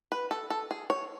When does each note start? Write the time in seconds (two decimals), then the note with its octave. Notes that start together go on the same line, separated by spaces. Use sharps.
0.12 B4
0.31 A4
0.50 A4
0.71 G#4
0.90 C#5